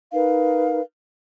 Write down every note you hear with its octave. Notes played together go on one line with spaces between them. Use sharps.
D#4 A#4 B4 F5